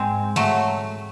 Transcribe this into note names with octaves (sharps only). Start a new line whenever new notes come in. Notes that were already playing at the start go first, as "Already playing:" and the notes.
Already playing: G#2 G#3 C4
F#3 A3